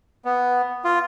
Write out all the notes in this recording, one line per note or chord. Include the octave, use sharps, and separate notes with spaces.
B3
F4